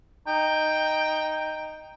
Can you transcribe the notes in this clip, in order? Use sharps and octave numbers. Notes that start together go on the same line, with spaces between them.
D#4 G5